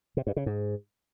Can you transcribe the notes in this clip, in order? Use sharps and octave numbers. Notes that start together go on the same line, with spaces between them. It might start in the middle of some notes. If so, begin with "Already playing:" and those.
C3
G2
C#3
G#2